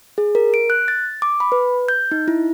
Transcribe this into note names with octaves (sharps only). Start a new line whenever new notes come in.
G#4
A#4
D7
F#6
A6
D6
B5
B4
G6
D#4
E4